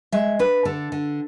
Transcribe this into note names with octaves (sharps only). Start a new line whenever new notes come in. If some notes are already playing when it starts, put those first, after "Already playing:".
G#3 E5
D4 B4
D3 A4
D3